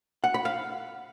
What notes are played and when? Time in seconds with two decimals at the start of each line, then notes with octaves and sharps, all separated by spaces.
0.24 F#5
0.34 B5
0.45 F5